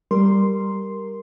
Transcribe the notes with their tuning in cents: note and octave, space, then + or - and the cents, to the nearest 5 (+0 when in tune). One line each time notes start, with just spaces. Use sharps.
G3 +0 A#4 +0 C6 +0